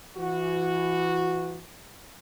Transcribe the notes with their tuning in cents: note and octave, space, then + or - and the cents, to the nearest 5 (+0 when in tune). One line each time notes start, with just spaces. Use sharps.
E3 +25 F#4 -10